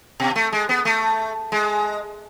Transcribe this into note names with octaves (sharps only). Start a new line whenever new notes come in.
B2
A3
G#3
B3
A3
G#3